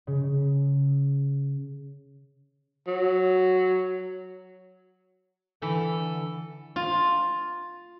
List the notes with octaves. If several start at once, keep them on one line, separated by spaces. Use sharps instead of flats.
C#3
F#3
D3 E3 A4
F4